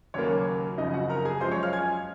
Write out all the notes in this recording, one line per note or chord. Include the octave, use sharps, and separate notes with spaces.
D#2 C#3 F#3 A#3 C#5
F#1 F2 C#3 D#4 D#5
F#4 F#5
A#4 A#5
G#4 G#5
F#2 F3 G#3 C5 C6
C#5 C#6
F5 F6
G#5 G#6